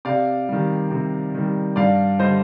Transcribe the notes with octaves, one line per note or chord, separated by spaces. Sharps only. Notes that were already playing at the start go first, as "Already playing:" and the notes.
C3 D5 F5
D#3 G3
C3
D#3 G3
G2 D5 F5
D3 G3 C5 D#5